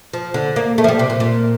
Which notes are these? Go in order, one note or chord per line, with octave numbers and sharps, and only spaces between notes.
F3
D3
A#3
A3
F3
G3
C3
A#2
A#2